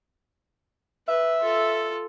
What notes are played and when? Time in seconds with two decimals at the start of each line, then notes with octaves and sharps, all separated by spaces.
1.08 B4 E5
1.40 F4 A4